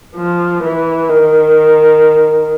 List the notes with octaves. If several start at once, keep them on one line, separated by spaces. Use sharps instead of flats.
F3
E3
D#3